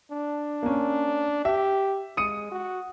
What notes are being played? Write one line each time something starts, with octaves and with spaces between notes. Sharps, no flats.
D4
A#3 C#4
G4 E5
G#3 D#6 C#7 D#7
F#4